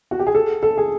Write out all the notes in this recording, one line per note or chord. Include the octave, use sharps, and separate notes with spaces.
F#4
G4
G#4
A4
A4
G#4